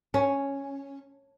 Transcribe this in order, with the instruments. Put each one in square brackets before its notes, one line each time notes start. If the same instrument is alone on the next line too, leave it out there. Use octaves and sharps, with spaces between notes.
[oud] C#4